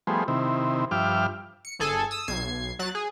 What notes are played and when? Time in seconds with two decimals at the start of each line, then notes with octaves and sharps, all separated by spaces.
0.07 F3 G3 A3 B3 G#4 C5
0.28 C3 D#3 C4 E4
0.91 G2 F3 E5 G5 D6 F6
1.65 C#7
1.79 G1 G#4 A4 G#5
2.11 D#6 E6
2.28 B1 G#6 C7
2.79 F#3 F#6 A6
2.95 G#4